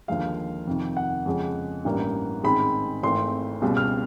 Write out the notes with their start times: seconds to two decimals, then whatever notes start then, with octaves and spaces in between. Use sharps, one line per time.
0.08 D#2 D3 F3 G#3 F5
0.67 F2 C3 D#3
0.97 F#5
1.26 F2 C#3 F3 G#3
1.85 A1 G2 E3 G3 A#3
2.44 A1 G#2 D#3 G#3 C4 B5
3.03 G#1 G#2 E3 A3 C4 C6
3.62 C#2 B2 G3 C4
3.77 F6